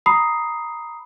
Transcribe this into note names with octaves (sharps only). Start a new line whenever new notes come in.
A#5 B5 D#6 C7